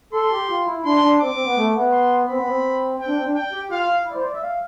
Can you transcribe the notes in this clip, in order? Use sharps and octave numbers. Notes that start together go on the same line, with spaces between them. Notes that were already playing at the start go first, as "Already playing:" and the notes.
A4 C6
G4
F4
E4
D4 C6
D4
C4 D6
C4
B3
A3
B3
C6
C4 B5
B3
C4
C4 G5
D4
C4
D4
G5
G4
F4 F5
E4
D5
C5
D5
E5
F5